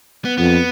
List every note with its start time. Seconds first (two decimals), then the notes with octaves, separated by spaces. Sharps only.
0.25 B3
0.38 F2 B3